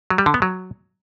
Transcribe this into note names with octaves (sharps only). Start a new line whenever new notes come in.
F#3
G3
D3
B3
F#3